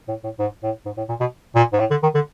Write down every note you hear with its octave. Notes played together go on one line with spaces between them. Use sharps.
A2
A2
G#2
A2
G#2
A2
A#2
B2
A#2
G#2
A2
D3
D#3
D3